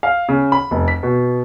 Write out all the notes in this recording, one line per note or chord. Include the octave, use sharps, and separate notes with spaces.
F5
C#3
B5
F1
B6
B2